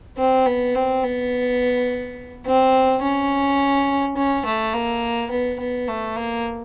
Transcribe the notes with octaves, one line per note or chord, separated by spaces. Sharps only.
C4
B3
C4
B3
C4
C#4
C#4
A3
A#3
B3
B3
A3
A#3